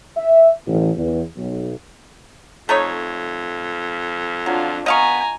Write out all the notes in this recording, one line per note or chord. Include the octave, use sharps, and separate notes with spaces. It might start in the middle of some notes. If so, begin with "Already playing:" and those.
E5
A1
E2
B1
F2 A3 D#4 C#5
F#3 D4 F4
B3 D#5 F5 G#5 A#5 C#6